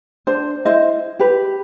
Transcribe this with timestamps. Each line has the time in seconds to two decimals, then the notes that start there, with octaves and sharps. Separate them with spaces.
0.27 D4 C5
0.65 E4 C5 D#5
1.19 G4 B4